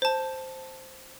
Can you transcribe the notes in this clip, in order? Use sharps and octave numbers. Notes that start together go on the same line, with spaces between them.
C5 A5